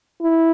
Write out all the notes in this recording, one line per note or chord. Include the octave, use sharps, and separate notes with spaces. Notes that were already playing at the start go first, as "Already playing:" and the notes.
E4